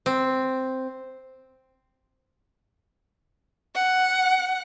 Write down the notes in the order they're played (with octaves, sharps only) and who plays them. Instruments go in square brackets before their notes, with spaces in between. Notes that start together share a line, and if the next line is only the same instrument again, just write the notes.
[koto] C4
[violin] F#5